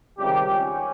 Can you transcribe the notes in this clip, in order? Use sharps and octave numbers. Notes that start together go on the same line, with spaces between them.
C#2 C3 D#3 G3 G4
C#4